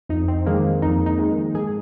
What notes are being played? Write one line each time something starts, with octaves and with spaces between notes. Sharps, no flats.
F2 D#4
C4
D#3 G#3 A#3
F2 D#4
D#4
D#3 G#3
G#2 G#4